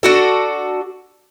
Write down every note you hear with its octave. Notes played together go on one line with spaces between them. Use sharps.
D4 F#4 A4